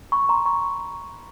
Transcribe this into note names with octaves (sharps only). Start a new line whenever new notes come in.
B5 C#6
A#5 C6
B5 C#6